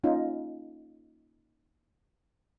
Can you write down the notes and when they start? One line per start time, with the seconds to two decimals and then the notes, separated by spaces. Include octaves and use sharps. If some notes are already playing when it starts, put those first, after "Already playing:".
0.04 A#3 C#4 D#4 F4